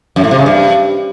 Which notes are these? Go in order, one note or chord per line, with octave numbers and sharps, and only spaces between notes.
F#2
A2
C3
C#3
G2